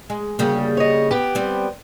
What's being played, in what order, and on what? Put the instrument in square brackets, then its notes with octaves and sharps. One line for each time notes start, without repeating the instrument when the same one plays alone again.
[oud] G#3
[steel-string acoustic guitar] D2 [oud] C#3 G3 A#3
[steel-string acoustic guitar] C#5 D#5
B3 G4
[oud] G3 C4